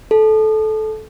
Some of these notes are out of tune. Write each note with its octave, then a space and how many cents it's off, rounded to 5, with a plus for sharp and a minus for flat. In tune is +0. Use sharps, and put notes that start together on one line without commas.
A4 -20